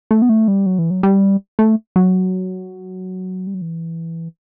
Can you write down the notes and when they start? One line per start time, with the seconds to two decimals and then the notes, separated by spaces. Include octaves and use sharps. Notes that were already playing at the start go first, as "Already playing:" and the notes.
0.11 A3
0.22 B3
0.29 A3
0.48 G3
0.66 F#3
0.79 E3
0.90 F#3
1.03 G3
1.59 A3
1.96 F#3
3.47 G3
3.54 F#3
3.62 E3